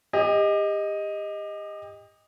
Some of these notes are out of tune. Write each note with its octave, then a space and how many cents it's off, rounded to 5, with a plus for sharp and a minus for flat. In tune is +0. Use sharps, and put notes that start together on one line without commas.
G4 +35 D#5 +0